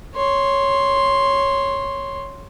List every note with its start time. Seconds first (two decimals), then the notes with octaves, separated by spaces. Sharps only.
0.15 C#5 C6